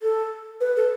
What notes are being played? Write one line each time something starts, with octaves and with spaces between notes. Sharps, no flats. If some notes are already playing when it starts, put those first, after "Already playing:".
A4
B4
A4